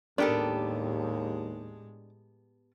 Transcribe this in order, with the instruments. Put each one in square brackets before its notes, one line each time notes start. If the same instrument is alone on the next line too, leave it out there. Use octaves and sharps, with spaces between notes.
[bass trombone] D#2 [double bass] A2 G#3 [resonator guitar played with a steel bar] B3 G4 A4 [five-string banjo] D4 A#4